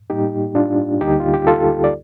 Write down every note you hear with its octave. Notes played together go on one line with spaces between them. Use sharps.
A2 G3 A#3 D#4 G4
D4 F4
D2 D3 G3 A#3 D#4 G4
F4
G4
F4 A4
D5